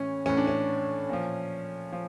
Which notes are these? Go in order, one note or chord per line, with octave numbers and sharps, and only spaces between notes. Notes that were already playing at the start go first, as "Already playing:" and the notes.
Already playing: A2 E3 C#4
A2 E3 C#4
D4
C#4
A#2 F3
F3